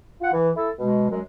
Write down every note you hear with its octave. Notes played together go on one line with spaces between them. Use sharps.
F4 F#5
E3
E4 A4
B2 G#3
F#2 F#3 G#3